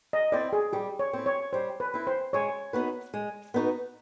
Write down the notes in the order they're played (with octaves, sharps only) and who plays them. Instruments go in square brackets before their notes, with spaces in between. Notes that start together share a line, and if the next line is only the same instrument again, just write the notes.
[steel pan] D#5
[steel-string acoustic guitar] C4 E4 [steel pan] D5
[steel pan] G#4
[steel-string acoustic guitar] G3 [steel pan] G4
[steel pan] C#5
[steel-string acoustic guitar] C4 E4
[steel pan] C#5
[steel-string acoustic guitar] G3 [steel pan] C5
[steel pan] B4
[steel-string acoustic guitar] C4 E4
[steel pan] C5
[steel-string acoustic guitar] G#3 [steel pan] C#5
[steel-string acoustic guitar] B3 D#4 F#4 B4
G#3
B3 D#4 F#4 B4